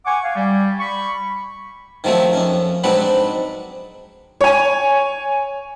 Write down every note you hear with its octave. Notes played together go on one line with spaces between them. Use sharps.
F#5 G#5 C#6 D6
F5 G#5
G3
B5 C#6
D#3 F3 F#3 A3 C4
F2 C#4
G#2 F#3 C4 D4 B4 F#5
C#5 G#5